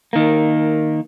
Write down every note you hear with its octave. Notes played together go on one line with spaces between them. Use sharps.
D#3 A#3